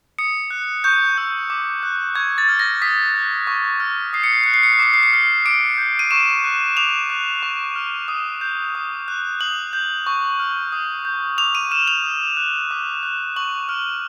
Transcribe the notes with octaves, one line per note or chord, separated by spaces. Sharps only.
D#6 C#7
F#6
C#6 G6
E6 G6
D6
F#6
C#6 G#6
A6
F6
A#6
D#6 B6
F#6
C#6
F6
D#6 C7
C#7
C7
F#6 C#7
C7
C#7
C7
D6 C#7
C7
C#7
F6 C7
D6 D7
G6
D#7
C#6 E7
F#6
D6 F7
F#6
C#6
F6
D#6
G6
D#6
F#6
D#6 F#7
G6
C#6
F6
D#6
G6
D6 F7
D#7
F6 E7
F7
D#6
F#6
D6
F#6
C#6 F#7
F6